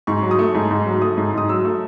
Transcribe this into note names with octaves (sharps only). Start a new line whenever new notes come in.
G#2 C#6
F#3
D#6
A3
G#2
G#2
F#3
A3 D#6
G#2
G#2 D#6
F#3 E6
A3